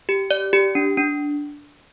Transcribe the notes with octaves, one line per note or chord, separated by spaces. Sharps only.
G4
D5
G4
D4
D4